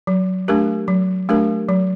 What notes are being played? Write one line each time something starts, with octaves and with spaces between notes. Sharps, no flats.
F#3
A3 D4 G4 A#4
F#3
A3 D4 G4 A#4
F#3